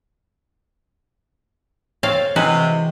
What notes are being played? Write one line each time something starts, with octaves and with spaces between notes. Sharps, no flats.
C4 A4 C#5 F5
C3 E3 G#3 F#4 B4